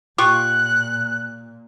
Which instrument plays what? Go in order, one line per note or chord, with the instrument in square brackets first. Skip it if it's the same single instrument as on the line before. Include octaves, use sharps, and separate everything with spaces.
[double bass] A#2 [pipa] F4 G4 C#6 [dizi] F#6